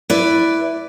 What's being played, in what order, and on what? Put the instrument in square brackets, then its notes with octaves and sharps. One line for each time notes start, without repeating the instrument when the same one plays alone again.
[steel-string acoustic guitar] E4 B4 D5